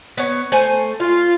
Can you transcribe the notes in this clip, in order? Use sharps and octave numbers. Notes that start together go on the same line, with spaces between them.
B3 C#5
A3 C5 G#5
F4 F5